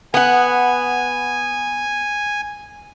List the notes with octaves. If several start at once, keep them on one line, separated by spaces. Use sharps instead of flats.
B3 F#5 G#5